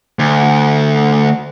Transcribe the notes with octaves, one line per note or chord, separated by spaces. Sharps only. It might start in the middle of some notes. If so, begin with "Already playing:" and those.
D2